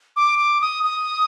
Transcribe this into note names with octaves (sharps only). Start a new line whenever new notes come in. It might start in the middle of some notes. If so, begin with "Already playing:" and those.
D6
D6
D#6
D#6